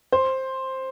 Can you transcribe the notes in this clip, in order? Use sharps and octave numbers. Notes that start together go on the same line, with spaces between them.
C5